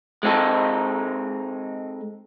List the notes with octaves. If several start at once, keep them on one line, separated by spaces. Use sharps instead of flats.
G#3 C4 D#4 A4